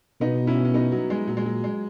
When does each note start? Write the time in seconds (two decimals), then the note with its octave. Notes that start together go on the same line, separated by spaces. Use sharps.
0.21 B2 B3 D#4
0.47 C#4 E4
0.65 C#4
0.74 B3 D#4
0.92 F#3
1.10 G#3
1.28 A#2 F#3
1.37 G#3
1.46 F#3
1.64 G#3